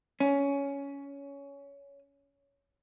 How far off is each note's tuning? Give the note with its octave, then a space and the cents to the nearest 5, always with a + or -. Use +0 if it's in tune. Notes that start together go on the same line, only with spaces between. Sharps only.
C#4 +15